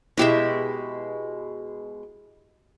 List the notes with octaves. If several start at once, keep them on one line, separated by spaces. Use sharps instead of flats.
B2 D#3 G#3 E4 G4 E5